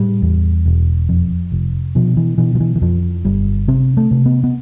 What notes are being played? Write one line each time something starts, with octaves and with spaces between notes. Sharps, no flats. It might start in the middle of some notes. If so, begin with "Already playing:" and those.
Already playing: A2 G3
E2
E1
F2
F1
B2 F3
E3
B2 E3
F3
E3
E3
F2 F3
G1 G3
C3 C4
A3
C3
B3
B3